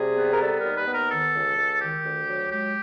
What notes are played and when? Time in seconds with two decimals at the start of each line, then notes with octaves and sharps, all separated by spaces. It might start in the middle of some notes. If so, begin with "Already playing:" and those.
Already playing: C3 G3 G#4
0.17 B3
0.32 A#4
0.40 G3 A4
0.58 A#4
0.64 D#2
0.76 B4
0.87 B3
0.93 A#4
1.10 D#3 A4
1.34 C#2
1.57 C#2
1.80 D#3 G4
2.04 D2
2.27 F#3
2.50 G#3 G4